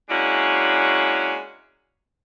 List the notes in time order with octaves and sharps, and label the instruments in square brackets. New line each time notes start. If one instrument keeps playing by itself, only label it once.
[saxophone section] G#3 A#3 C#4 D4 E4 F#4